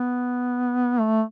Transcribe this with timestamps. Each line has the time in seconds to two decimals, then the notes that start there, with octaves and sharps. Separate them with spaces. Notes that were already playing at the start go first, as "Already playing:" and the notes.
Already playing: B3
1.00 A3